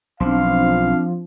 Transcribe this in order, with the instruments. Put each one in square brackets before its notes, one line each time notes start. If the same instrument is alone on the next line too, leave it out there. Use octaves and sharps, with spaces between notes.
[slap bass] B1 [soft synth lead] F3 [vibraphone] C4 D4 [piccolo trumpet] F5